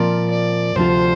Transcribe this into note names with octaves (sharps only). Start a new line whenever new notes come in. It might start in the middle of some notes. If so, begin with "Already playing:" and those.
Already playing: A#2 F3 C4 F4 A#4 D5
D5
D2 C3 F3 D4 F4 C5